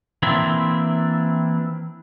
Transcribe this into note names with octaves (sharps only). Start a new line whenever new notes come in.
E3 A#3 C4 D4 E4 E5